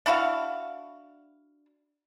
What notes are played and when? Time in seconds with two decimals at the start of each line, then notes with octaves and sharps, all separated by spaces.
0.06 D4 E4 F#4 F5